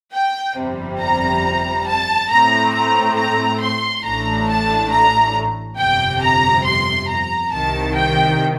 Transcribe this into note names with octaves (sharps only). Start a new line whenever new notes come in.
G5
G1 F2 C3 G3
A#5
A5
A2 A3 C4 A#5
A#5
A#5
C6
A1 A2 A3 D4 A#5
A5
A#5
G1 F2 C3 G5
A#5
C6
A#5
C2 C3 D#3 A5
G5